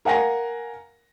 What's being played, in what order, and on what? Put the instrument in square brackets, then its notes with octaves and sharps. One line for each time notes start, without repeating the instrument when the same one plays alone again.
[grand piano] A#4 F5 F#5 G#5 A#6